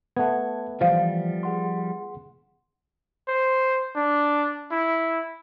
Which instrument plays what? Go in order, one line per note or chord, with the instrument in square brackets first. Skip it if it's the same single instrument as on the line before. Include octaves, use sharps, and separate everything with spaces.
[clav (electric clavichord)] A3 B3 [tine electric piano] F#5 G#6
[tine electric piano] E3 [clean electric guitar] F3 G3 [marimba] C5 F5
[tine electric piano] G#4 F#5 C6
[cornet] C5
D4
E4